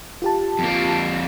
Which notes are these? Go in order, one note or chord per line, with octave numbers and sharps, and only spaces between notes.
F4 G4 A5
F2 A#3